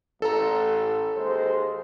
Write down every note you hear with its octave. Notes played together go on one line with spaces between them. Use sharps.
A1 A4 A#5
D#2 G#3 C5